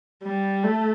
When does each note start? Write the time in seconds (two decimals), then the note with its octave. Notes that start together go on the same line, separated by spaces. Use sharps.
0.24 G3
0.64 A3